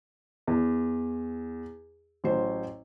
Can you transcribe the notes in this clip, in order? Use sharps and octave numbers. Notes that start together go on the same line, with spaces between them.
E2
A1 F#3 C5